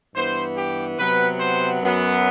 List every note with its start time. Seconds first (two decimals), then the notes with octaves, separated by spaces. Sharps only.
0.15 G2 E3 B3 C5
0.57 G4
0.98 C3 F#3 B3 B4
1.40 C5
1.82 F#2 F#3 B3